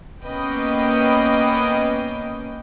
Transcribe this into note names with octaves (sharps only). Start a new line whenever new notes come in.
A#3 B3 C#4 B4 D#5 G5